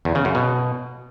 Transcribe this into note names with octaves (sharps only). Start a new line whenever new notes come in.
E2
C#3
F#2
B2